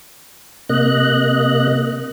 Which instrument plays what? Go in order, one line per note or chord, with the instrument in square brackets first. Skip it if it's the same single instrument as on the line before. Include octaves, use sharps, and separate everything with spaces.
[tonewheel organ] C3 A#3 D#5 F#6